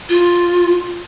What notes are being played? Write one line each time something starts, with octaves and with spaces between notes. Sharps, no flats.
F4